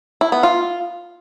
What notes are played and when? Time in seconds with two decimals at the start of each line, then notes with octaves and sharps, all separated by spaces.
0.21 E4
0.32 B3
0.43 F4